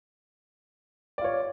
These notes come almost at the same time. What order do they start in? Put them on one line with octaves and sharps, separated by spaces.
D5 F4 C#5